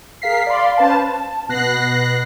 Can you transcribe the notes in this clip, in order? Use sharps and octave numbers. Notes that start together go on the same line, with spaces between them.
G#4 A#4 F5 B6 C7
D5 F5 B5 C6
C#4 B4 C5 F5 A5
A5
B2 B3 F#6 A#6 C7